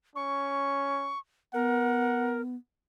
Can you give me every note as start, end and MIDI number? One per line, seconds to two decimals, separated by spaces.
0.16 1.12 61
0.16 1.19 85
1.54 2.56 59
1.54 2.41 70
1.54 2.37 78